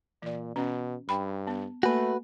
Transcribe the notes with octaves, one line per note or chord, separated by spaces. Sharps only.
A#2 E3 D5
B2 C#4
G2 G5 B5
B3
A3 A#3 F#4 B4